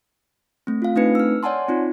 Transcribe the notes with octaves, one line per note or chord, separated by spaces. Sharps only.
A3 C4
F4 F5
A3 C4 D4 D#4 B4 C#7
E6 F6
C#5 D5 F#5 G#5 A5 C6
C4 D#4 F4